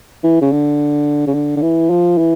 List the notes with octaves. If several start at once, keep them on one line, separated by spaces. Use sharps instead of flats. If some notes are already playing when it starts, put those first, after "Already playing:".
E3
C#3
D3
C#3
D3
D3
E3
F3
E3